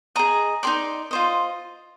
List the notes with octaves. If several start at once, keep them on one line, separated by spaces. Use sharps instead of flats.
G#4 D#5 A#5
D#4 G#4 D5 C6
F4 C5 D#5